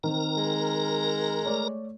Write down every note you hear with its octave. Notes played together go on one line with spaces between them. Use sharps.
D#3 C4 A#4 A#5
G#3
A3 C#5 D5